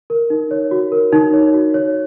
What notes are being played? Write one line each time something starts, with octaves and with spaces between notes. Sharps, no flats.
A#4
D#4
C#5
F#4
A#4
D#4
C#5
F#4
C#5